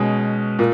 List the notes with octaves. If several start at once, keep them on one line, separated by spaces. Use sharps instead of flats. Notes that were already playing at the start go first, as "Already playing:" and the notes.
Already playing: B2 G#3 C#4
A#2